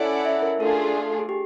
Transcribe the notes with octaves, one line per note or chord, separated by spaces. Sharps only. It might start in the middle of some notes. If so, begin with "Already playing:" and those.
Already playing: C#4 E4 A4 D5 F#5
E5
A#4
A3 D4 F4 G#4 A4
G#4
G4